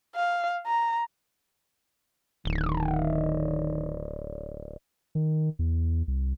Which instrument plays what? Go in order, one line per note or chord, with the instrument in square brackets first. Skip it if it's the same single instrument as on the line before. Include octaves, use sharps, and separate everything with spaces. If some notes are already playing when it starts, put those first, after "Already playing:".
[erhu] F5
A#5
[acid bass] D1 [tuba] D#3
[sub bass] D#3
E2
C2